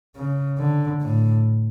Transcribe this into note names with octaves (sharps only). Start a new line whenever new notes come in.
C#3
D3
A2